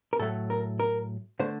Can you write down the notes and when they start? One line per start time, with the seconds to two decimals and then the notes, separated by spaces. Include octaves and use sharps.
0.13 A#4
0.19 A2 F#3 A3 A4
0.50 A#4
0.80 A#4
1.40 D3 A3 C5